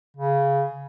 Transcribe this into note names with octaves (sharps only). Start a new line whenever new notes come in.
C#3